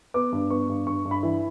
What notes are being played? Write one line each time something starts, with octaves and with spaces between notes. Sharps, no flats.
B3 D6
G2
B3 C#6
G2
G2 C#6
G2
B5
E3